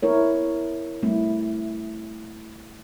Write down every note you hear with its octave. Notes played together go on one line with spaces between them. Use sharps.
B3 E4 A#4 C#5
G3 A3 C4 E4